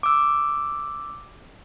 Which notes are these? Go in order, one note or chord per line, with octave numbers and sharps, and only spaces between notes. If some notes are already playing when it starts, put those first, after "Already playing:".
D6 E6